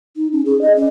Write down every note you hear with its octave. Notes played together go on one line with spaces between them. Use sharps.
D#4
C#4
G#4
D#5
C#4